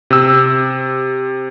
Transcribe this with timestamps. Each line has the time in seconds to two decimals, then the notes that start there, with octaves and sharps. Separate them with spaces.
0.10 C3 E6